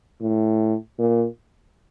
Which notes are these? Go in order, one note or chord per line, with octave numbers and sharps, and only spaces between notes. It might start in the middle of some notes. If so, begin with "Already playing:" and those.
A2
A#2